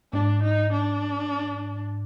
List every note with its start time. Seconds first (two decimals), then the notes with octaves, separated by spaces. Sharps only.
0.13 G#2 D4
0.43 D#4
0.73 D4